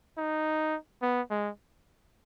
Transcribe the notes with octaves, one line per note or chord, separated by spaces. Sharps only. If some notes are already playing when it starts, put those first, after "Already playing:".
D#4
B3
G#3